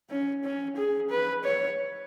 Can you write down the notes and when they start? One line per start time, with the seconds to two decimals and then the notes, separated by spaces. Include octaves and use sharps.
0.10 C#4
0.44 C#4
0.77 G#4
1.10 B4
1.44 C#5